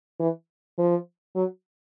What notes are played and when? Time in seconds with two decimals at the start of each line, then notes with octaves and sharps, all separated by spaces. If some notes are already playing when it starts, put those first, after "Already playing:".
0.20 E3
0.78 F3
1.35 F#3